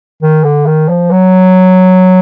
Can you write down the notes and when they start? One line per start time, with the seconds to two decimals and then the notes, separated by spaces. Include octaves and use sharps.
0.22 D#3
0.44 D3
0.66 D#3
0.89 F3
1.11 F#3